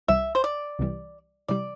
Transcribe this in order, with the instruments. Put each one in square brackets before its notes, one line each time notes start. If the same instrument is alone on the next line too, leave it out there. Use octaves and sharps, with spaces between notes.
[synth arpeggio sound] C2 C3 E3 G3 [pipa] E5
[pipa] C5
D5
[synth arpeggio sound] C2 C3 E3 G3
[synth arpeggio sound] C3 E3 G3 [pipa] D5